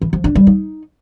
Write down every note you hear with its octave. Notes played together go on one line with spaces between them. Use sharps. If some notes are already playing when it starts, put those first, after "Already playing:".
E3
F3
D4
G3
D#4